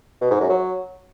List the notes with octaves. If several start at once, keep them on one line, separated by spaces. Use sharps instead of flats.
B2
G#2
F#2
F#3